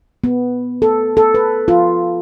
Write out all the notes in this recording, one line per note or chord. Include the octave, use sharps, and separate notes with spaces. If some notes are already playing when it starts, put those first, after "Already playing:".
B3
A4
A4
B4
F4